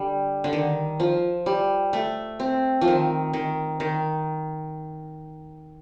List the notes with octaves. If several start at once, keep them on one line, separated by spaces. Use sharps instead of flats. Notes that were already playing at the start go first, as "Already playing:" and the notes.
Already playing: D3 G3
D3
D#3
F3
G3
A3
C4
F3
D#3
D#3
D#3